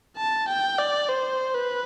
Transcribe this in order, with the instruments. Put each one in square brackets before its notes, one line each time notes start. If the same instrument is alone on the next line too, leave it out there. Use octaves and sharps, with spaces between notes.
[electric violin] A5
G5
D5
C5
B4